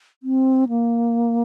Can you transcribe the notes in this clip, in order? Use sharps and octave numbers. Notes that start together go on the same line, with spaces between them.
C4
A#3